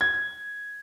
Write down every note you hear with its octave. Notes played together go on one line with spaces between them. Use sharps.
G#6